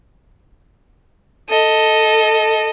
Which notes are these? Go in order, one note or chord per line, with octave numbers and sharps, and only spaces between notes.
A4 D#5